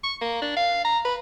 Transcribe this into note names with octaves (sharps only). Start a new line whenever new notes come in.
C#6
A#3
D4
F5
A#5
B4